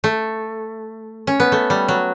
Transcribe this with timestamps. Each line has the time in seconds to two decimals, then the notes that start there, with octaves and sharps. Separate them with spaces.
0.04 A3
1.27 C#4
1.40 B3
1.52 A3
1.70 G3
1.88 F#3